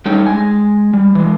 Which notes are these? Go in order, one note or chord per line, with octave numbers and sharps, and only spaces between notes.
G3 A3 C#4 D#4 G5
G#3 G#5
G3
E3 G#3